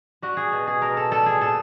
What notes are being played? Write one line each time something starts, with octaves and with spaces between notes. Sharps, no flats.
G3 F#4
G#4
B2
G#4
B2 A#4
A4
G3 A4
G#4
A#2 A4